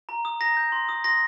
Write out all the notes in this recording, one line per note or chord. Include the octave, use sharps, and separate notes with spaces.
A#5
D#6
A#5 A#6
G6
C6
D#6
C6 A#6